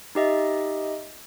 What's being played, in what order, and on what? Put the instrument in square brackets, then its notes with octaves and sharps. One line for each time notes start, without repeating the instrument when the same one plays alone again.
[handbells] D#4 G4 D#5 E5